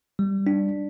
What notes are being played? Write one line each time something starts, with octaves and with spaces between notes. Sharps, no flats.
G3
D4